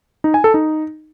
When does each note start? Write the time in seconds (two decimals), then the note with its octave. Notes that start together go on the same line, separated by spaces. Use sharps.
0.24 D#4
0.34 G#5
0.44 A4
0.54 D#4